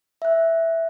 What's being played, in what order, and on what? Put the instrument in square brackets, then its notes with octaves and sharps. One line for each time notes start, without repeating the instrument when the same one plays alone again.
[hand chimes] E5 F#6